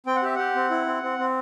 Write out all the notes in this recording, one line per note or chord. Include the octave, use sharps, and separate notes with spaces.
C4 G5
F#5
G4 E5
G4 F#5
C4
E4
C4
C4
C4